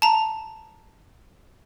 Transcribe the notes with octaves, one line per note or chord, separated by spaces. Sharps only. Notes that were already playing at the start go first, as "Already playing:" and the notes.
A5 A#5